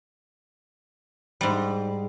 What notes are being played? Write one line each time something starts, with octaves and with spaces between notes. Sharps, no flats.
G#2 G3